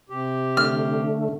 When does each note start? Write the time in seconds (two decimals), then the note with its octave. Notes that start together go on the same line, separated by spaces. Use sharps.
0.09 C3 G4
0.57 D3 A3 F6